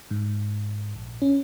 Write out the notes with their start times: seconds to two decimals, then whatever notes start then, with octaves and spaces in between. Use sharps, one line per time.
0.11 G#2
0.95 A#1
1.22 C#4